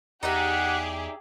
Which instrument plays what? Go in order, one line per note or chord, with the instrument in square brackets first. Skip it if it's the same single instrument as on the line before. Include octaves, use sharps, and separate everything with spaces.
[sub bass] E2 [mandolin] D#4 D5 E5 [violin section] G4 G#4 [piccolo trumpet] F#5